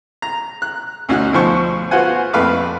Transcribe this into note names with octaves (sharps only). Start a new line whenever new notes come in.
A#5
F#6
D2 C#4 D#4 F#4 F6 F#6
D2 B2 F3 C5 C#6
B3 F4 F#4 C5 F#5 G#5
A#1 F2 A3 B4 F5 D6